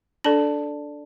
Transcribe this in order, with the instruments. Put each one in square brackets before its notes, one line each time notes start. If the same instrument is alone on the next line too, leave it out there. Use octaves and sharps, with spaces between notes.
[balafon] D4 A4 [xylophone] D5 A5 F#7